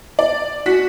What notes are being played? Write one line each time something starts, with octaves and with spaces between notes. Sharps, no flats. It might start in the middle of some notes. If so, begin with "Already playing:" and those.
D5
F#4 B6